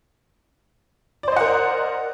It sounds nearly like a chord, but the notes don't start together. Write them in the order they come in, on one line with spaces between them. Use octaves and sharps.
D5 C5 D#5 F#5 A#4